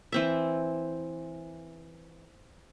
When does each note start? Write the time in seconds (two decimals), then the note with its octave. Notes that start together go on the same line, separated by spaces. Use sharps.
0.12 E3 C4 E5